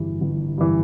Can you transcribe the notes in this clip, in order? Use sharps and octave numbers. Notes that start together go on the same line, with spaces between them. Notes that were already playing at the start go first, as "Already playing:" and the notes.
Already playing: G1 G2 E3
G1
G2 E3